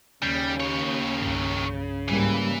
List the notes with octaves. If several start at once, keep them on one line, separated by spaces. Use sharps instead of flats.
D#2 C#3 G3 G6
D#3 C#5
C2 G2
G#2 E3 G3 A#3